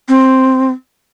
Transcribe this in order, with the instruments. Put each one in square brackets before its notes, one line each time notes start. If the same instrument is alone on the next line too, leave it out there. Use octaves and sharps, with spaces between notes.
[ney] C4